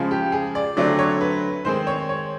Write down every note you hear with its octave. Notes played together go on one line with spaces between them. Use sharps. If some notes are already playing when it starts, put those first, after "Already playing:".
Already playing: C#3 F3 G#3
G4
G#4
D5
D3 F#3 A3 C4 D5
C#5
B4
D#3 G#3 C4 C5
C#5
C#5